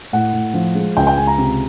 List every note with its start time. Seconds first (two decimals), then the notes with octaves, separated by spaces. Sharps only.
0.13 A2 F#5
0.33 A2
0.54 F3
0.75 G#3
0.97 C#2 G5
1.07 G5
1.17 C#2 G#5
1.27 A#5
1.38 C3